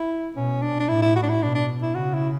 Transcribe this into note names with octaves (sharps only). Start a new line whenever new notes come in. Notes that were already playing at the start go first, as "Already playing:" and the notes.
Already playing: E4
B2 C#4
D4
D4
A2 E4
E4
F#4
D4
E4
B2 D4
D4
E4
C#3 F#4
E4